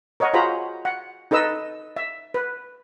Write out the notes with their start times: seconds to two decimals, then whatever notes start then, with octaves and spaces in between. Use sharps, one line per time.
0.20 A#4 C#5 D#5 F#5
0.34 F4 F#4 G#4 C5 A#5 B5
0.85 F#5
1.31 D#4 A4 B4 D#5 E6
1.96 E5
2.34 B4